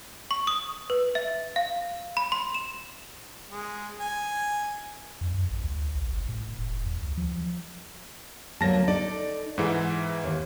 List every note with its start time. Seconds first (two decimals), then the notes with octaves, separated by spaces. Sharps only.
0.31 C#6
0.47 D#6
0.90 B4
1.15 E5
1.56 F5
2.17 B5
2.32 C6
2.54 E7
3.50 G#3
4.00 G#5
5.21 F2
5.34 F#2
5.51 A1
5.62 D2
5.94 A#1
6.12 G1
6.29 A2
6.58 E1
6.84 E2
7.03 D2
7.18 F3
8.61 D2 F#3 A#3 A5 A#6
8.88 D#4 A4 D5
9.58 G#2 E3 G#4 F#5
10.24 D#2